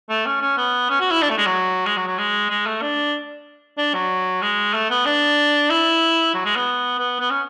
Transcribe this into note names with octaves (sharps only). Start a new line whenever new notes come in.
A3
C#4
C#4
B3
C#4
F#4
E4
D4
A3
G#3
F#3
G#3
F#3
F#3
G#3
G#3
A3
D4
D4
F#3
G#3
A3
B3
D4
E4
F#3
G#3
B3
B3
B3
C#4